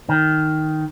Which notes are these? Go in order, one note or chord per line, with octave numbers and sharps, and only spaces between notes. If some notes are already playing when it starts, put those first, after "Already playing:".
D#3